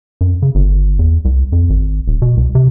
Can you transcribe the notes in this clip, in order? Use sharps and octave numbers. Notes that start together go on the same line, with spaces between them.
F#2
C#3
G1
E2
C2
F2
G#1
D#1
B2
C2
C3